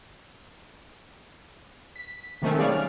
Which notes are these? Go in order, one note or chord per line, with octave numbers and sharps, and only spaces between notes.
B6
C3 D#3 A3 C4 C#4
G3 G#4 C#5 D5 F5
F6